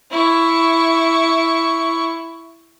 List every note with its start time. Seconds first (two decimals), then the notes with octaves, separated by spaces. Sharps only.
0.11 E4 C#6